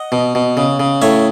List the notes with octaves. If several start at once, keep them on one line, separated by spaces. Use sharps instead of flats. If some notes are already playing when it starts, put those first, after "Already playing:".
Already playing: D#5 F#5
B2
B2
C#3
C#3
A2 C#5 E5